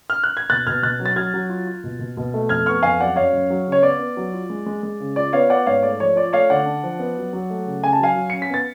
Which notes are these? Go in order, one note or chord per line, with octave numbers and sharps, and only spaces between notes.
F6
F#6
G#6
B2 F#6 A6
B2 F6 G#6
B2 F#6 A6
F#3
A6
F#3 F6 G#6
F#3
F4
F4
B2
B2
B2
A3
F2 F6 G#6
B3 C#6 F6
F2 F5 G#5
F#3 D5 F#5
F#2 C#5 F5
F#2
F#3
C#3
C#5
B3 D5
B3
F#3
F4
G#3
G#3
G#3
C#3
F4 D5
B3 C#5 F5
B3 D5 F#5
G#2 C#5 F5
A3 D5
F3 C#5
F4 D5
A3 C#5 F5
D3 D5 F#5
D4
F3
B3
F#3
F#3
A3
C#3
C#3 G#5
A5
F#3 F5 G#5
F#3
C#4 C#7
B6
B3 A6